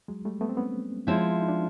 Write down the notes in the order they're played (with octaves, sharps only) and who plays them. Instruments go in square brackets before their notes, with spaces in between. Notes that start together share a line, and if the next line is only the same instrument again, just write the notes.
[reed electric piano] F#3 G#3
G3 A3
A3 B3
C4
B3 C#4
[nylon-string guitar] F3 G#3 C4 E4
[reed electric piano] D#4
D4